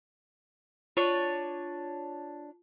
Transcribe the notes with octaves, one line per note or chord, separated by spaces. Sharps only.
D4 F4 C#5